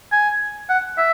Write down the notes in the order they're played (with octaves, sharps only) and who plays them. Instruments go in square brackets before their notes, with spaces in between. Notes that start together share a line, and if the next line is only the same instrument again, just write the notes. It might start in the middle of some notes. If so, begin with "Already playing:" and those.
[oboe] G#5
F#5
E5